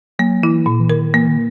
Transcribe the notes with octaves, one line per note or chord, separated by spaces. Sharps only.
F#3 A#3
E3 E4
A#2
E3
D#3 A#4
E3 A#3
D#3